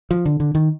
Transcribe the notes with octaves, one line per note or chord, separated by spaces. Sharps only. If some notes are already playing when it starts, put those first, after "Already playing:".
F3
D3
D3
D#3